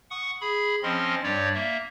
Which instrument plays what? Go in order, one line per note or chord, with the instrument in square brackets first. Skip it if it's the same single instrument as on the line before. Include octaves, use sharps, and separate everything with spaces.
[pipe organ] F#5 C#6 D#6
G#4 B5
F3 C4 C#4 D#5 C6
G2 G3 C#5 D5
A#3 E5